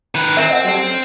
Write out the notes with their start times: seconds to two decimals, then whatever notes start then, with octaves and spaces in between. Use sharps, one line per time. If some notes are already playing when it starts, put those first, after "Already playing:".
0.15 D#3 B4
0.37 E3 C4 A#4 E5
0.50 D#5 F#5
0.65 F#3 G3 A4
0.84 F#2